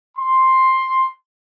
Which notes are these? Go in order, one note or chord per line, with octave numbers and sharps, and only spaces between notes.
C6